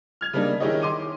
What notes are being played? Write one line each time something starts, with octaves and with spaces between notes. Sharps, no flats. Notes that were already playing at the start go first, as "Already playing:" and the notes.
F6 G#6 F7
C#3 G3 A#3 D4 D#4
D#3 E4 G4 G#4 C#5 D#5
C6 D6 D#7